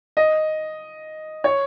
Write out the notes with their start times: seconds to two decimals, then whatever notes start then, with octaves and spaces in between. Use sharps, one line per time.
0.17 D#5
1.44 C#5